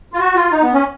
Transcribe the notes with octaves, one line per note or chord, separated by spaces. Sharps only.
F4
F#4
F4
D#4
B3
C#4